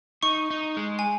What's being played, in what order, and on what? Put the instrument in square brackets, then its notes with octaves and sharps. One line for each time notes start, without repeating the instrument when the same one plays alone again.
[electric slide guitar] D#4 [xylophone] C#6
[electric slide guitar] D#4
G#3
[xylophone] G#5